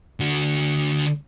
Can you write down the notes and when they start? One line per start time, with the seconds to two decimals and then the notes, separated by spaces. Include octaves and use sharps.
0.20 D3 F#4